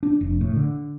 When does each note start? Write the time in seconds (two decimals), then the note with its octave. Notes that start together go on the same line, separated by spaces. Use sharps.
0.03 D4
0.21 F1
0.41 A2
0.56 D3